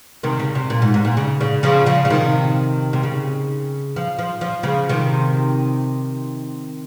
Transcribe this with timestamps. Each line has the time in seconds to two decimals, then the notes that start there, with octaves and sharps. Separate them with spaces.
0.23 C3 D#3
0.39 C#3
0.55 C3
0.70 A#2
0.82 G#2
0.94 G#2
1.05 A#2
1.17 C#3
1.41 C#3
1.63 C#3 F3
1.86 C#3 F3
2.05 C#3
2.10 C3 D#3
2.93 C3
3.03 C#3
3.96 F3
4.19 F3
4.41 F3
4.63 C#3 F3
4.89 C3 D#3